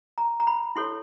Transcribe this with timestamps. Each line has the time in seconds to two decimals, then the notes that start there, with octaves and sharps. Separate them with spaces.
0.18 A#5
0.40 A#5
0.47 B5
0.76 E4 A4 C#5 C6